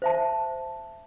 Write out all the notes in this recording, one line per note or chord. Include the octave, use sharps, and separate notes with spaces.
C5 E5 A5